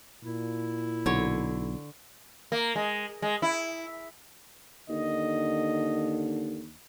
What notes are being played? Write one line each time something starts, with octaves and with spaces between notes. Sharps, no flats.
A#2 E4
B1 D3 C#5
A#3
G#3
G#3
E4
D#2 D3 D#5